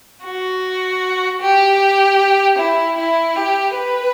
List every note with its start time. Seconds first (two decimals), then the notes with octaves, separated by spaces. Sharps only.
0.24 F#4
1.41 G4
2.58 E4
2.98 E4
3.36 G4
3.75 B4